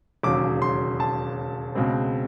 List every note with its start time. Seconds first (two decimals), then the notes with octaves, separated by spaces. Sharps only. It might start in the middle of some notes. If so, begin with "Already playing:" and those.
0.23 E1 D#2 C#3 F#3 D6
0.62 C6
1.00 A5
1.75 C#2 B2 G#3 C4